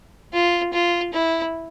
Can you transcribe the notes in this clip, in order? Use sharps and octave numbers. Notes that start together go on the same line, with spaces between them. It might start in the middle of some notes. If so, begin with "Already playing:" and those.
F4
F4
E4